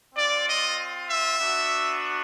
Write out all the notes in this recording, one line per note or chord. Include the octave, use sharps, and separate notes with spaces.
C4 F4 D5
D#5
E5
B3 D4 F#4